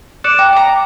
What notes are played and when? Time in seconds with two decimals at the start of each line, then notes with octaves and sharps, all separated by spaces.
0.24 D5 F#6 C#7 E7
0.39 G5 A#5
0.53 D5 A#5